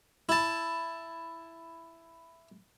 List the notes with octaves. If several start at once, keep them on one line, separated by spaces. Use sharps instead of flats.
E4 A5